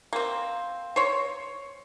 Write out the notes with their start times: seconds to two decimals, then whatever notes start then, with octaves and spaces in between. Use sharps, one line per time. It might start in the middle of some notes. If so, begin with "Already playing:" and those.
0.13 A#3 C4
0.96 C5 C#5